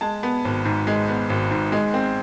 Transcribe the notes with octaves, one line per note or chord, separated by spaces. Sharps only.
G#3 A5
B3
G#1
G#2
G#3
B3
G#1
G#2
G#3
C4